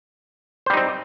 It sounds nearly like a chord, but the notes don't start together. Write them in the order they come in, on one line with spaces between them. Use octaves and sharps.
C5 G3 D#4 C4